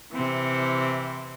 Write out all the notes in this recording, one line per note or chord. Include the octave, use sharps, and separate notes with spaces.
C3 E3 C4